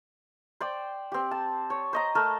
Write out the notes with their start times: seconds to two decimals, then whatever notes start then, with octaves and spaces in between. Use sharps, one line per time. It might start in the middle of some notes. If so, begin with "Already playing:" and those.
0.61 C5 D5 G5
1.12 C4 G4
1.31 A5
1.70 C#5
1.93 C5 D#5 A#5
2.15 A3 A#4 A5